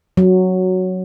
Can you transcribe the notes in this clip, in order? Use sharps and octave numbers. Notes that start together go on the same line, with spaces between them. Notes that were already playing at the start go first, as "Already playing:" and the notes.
F#3